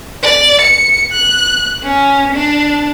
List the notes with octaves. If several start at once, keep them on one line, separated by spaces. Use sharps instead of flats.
D5
C#7
F#6
C#4
D4